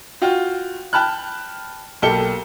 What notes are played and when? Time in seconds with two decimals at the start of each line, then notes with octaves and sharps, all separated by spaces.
0.22 F4 F#4 G5
0.93 G5 A5 B5 F6 F#6
2.02 B1 A#3 G4 A4 C#7 G7